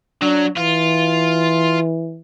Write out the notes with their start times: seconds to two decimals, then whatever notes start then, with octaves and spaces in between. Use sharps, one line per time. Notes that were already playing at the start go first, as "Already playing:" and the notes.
0.22 F#3 D4
0.57 E3 F4